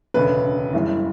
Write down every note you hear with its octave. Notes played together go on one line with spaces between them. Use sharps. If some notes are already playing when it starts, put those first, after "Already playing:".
E1 D2 C#3 B4
F#1 F#2 C#3 E3 G3